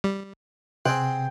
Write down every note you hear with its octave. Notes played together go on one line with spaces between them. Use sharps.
G3
C3 C4 G#4 C5 G5 F#6